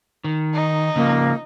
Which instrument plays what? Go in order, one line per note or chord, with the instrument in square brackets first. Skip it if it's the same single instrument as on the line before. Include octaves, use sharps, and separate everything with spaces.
[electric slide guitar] D#3
[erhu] D#4
[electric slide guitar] C#3 F3 [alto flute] A#3